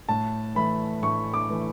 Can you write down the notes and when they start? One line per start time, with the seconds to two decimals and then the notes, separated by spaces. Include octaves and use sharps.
0.09 A2 A5
0.55 E3 A3 B5
1.02 A2 C#6
1.34 D6
1.50 E3 A3